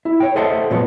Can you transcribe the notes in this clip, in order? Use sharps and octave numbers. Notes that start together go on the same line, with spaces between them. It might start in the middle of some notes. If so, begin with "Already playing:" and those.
E4
C#5 G5
A4 C5 D#5 E5 F#5 A5
A#2 F3 F#3 B3 C#4